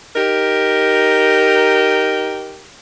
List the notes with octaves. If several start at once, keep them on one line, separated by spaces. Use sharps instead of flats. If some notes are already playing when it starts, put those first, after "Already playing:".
D#4 G4 A#4